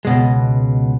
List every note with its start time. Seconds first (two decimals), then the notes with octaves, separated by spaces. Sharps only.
0.05 C#2 B2 G#3